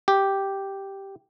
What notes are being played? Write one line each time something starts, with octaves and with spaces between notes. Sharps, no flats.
G4